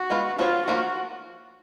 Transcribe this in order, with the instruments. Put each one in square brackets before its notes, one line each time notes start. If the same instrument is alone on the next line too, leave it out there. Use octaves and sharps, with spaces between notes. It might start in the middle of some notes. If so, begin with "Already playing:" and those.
Already playing: [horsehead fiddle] F#4
[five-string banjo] G#3 B3 F4 B4
[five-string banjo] F3 B3 F#4 C#5 [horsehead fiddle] F4
[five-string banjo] F3 A#3 F4 [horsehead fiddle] F#4